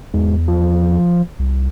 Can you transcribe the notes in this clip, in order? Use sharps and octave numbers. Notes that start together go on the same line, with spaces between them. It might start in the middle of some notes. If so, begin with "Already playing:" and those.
E2 G#2
F3
C2